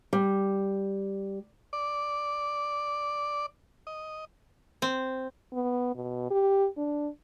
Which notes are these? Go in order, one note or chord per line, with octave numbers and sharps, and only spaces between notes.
G3
D5
D#5
C4
B3
B2
G4
D4